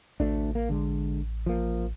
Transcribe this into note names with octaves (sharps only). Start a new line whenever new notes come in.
A1 D2 A3 D4
A#3
D3 G#3
F3 A#3